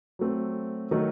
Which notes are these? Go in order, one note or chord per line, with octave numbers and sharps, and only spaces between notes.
F#3 A3 C4
D#3 F#3 A3